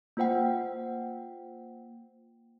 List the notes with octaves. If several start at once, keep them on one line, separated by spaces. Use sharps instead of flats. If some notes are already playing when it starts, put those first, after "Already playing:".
A#3 F4 C5 F#5 G5